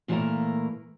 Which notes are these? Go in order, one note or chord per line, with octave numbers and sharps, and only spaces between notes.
A#2 E3 G3 A3 A#3 A#4